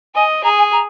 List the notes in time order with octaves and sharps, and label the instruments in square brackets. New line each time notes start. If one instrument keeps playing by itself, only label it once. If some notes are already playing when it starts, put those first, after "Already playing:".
[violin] D#5 [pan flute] G#5
[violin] G#4 [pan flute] A#5
[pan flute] G#5
A#5